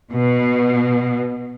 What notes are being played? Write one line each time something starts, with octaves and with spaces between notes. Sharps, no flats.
B2